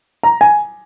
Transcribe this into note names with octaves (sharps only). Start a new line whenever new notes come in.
A#5
G#5